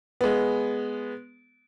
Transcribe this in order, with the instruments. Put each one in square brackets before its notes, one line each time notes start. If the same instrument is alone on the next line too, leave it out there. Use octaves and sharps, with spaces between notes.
[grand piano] G#3 B3